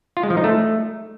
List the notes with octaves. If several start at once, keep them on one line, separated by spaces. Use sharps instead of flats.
F4
G#3
F3
D#4
A3